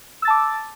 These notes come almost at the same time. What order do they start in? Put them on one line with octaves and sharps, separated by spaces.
E6 A6 A5 D6